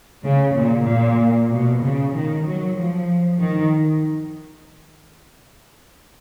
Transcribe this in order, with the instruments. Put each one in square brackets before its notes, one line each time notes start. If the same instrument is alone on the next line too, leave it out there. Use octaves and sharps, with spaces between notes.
[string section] C#3
A#2
A#2
B2
C#3
D#3
F#3
F3
D#3